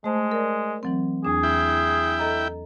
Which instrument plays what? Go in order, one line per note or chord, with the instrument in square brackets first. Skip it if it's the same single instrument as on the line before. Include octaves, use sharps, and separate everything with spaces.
[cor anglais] G#3 [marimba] A3 C5 A5
[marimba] A#4 D5
E3 F#3 C4
[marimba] E2 D4 [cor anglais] G#4
[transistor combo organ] E4 G5
[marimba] A4 D#5 A#5